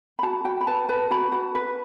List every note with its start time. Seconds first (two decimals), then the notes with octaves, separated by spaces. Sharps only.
0.19 B5
0.23 F#4 A5
0.45 F#4 G5
0.61 B5
0.67 B4 A5
0.88 B4 A5
1.11 F#4 B5
1.32 F#4 A5
1.55 B4